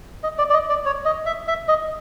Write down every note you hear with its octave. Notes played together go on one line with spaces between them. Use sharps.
D#5
D5
D5
D#5
D5
C#5
D#5
E5
E5
D#5